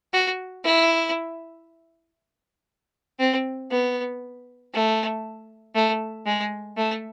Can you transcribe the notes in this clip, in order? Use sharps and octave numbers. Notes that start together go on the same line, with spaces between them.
F#4
E4
C4
B3
A3
A3
G#3
A3